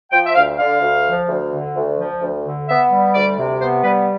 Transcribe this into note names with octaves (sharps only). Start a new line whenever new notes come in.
F3 G5
E5
D2 F5
D3 F5
D2
F3
D2
D3
D2
F3
D2
D3
B3 E5
G3
D2 D5
C3
B3 C5
G3 B4